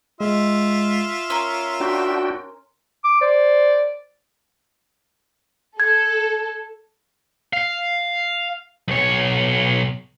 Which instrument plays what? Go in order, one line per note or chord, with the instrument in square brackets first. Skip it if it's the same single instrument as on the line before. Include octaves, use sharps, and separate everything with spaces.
[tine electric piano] G#3 [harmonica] F4 E5
[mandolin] C#4 A#4 [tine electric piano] C6
[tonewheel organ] D4 F#4 G5
[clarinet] D6
[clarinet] C5 [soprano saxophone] D5
[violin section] A4 [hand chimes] G#6
[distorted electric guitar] F5
B1 C#5